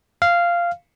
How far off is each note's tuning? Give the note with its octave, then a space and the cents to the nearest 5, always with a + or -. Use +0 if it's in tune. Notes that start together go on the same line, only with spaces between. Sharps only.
F5 -10